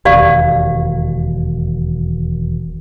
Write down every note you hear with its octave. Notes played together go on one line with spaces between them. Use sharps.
E1 D#2 G4 D5 F5